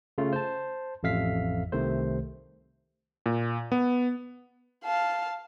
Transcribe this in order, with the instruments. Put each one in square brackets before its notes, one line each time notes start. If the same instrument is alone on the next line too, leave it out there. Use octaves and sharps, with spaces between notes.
[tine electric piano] C#3 A3 F4
C5 A5
A1 F2 E5 F5 B6
C2 C3 D#3 A3 C5
[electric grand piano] A#2
B3
[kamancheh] F5 A5